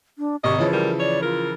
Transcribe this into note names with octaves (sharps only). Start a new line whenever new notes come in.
D4
G#1 C3 G4 D#5 C#6
C#3 E3 F3 C#5
G3 A#4
C#5 D5
F4 A#4